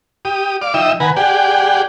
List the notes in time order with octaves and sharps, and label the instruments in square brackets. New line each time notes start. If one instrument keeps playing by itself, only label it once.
[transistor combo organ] G4 D#6
D5 F5 D6
F3 D#4 D#5 E5 G5 E6
D#3 B4 F#5 G#5 A#5
G4 G#4 D5 F#5 G5